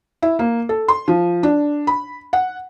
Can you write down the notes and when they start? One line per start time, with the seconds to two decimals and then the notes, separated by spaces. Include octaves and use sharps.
0.22 E4
0.39 A#3
0.69 A4
0.88 C6
1.08 F3
1.43 D4
1.87 B5
2.33 F#5